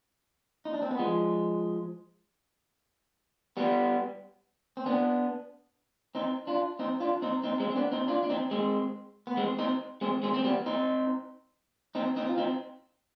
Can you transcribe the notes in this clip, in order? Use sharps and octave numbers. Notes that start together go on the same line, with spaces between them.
D#4
D4
C4
B3
F3 G#3
G3 B3
C4
B3 D4
C4 D#4
D4 F4
C4 D#4
D4 F4
C4 D#4
C4 D#4
G#3 C4
C4
B3 D4
C4 D#4
D4 F4
D4
C4 D#4
G#3 C4
B3
G#3 C4
C4 D#4
G#3 C4
G#3 C4
C4
G3 B3
C4 D#4
C4 D#4
C4 D#4
F4
C4 D#4